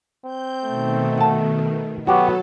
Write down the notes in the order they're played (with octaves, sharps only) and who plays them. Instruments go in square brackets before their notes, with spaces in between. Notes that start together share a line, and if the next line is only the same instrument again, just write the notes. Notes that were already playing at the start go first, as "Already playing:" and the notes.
[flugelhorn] C4 [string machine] G6
[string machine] B2 D#3 [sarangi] A3
[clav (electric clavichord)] F#5 A5
[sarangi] F#3 [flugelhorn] B3 [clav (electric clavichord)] F#4 G4 F#5 [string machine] A4